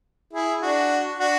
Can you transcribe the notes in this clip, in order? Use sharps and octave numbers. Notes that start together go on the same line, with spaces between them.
E4 G#4
D4 F#4
D4 F#4